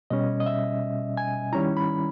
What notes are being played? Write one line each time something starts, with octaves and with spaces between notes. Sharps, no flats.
B2 G3 C#4 D#5
D#5
E5
G#5
D#3 G3 C#4 E4 A#5
B5